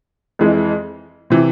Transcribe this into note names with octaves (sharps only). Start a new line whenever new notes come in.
F2 E3 G#3
C3 E3